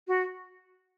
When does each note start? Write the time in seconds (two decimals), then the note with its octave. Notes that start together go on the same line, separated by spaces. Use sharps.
0.08 F#4